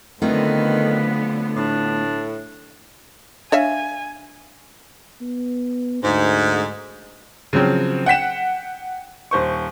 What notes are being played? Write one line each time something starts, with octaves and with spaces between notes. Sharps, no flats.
D3 D#3 F#3 A3 B3 C4 F4 B4
A2 D4
D4 C#5 E5 F5 G#5
B3
D2 G#2
C#3 F3 F#3 C4
F#5 G5 B6 E7
D#1 C5 C#6